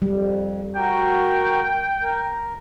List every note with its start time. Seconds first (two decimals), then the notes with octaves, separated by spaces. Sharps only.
0.02 F2 G3
0.76 F#4 A#4 G5
2.02 A#4